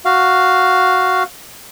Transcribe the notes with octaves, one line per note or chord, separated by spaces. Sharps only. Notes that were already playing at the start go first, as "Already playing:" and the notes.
F#4 F5